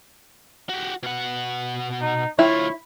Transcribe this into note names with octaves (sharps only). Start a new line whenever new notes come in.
F#4 G4
B2 F#5
D#4
D2 E4 F4 C#5